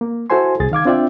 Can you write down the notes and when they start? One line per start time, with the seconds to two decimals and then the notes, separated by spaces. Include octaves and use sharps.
0.01 A#3
0.30 E4 F#4 A4 C5 G#5 C6
0.60 C2 G#4 A6
0.72 D#3 F5 D6 G#6
0.85 C4 D4 F4 D5 E5 G5